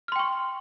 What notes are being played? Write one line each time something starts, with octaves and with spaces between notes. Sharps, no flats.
G5 C6 C#6 F6